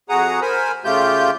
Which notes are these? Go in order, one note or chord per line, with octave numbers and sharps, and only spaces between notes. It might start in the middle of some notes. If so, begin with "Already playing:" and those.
F2 F#4 G#4 F#5 A#5 D#6
A#4 C5 G#5 B5
C#3 A3 F4 G4 G6